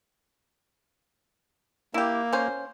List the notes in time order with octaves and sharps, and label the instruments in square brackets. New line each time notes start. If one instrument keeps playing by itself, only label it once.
[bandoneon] A#3 [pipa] E4 G4
[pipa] C#4 C5